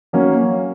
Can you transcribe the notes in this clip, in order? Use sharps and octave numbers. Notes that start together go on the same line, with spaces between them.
F#3 A#3 C#4